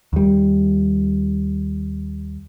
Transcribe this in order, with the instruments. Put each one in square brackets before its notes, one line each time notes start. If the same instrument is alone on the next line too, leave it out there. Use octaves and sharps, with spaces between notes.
[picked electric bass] D#2 G3